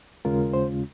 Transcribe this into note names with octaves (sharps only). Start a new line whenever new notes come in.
D#2 C#3 G#3 C#4 F4 A#4
C5